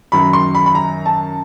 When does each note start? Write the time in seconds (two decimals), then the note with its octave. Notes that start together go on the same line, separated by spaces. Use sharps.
0.12 F#2 D#3 F#3 B5
0.33 C6
0.55 B5
0.66 B5
0.75 A#5
1.06 A5